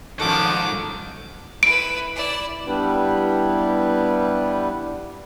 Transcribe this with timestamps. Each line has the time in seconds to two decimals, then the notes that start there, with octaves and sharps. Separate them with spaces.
0.20 G#2 D#3 F3 C#4 F#4 A4 D6
1.63 E4 B4 D7
2.15 E4 D5
2.67 G3 B3 D4 E4 G4 B4